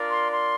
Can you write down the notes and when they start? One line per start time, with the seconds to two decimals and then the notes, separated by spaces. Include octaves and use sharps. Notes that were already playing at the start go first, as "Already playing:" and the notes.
Already playing: D4 F4 A#4 D5
0.10 C6
0.32 C6